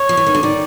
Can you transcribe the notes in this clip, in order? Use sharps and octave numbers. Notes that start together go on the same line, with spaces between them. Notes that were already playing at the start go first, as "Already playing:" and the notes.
Already playing: C#5
F3
E3
D#3
D3
D#3 D5